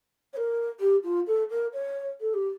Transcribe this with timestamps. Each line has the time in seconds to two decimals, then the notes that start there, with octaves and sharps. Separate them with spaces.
0.33 C#5
0.37 A#4
0.80 G4
1.04 F4
1.27 A4
1.50 A#4
1.73 C#5
2.21 A4
2.34 G4